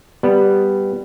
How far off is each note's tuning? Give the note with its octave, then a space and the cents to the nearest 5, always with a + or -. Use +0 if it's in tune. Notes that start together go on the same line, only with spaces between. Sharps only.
G3 +0 B3 +0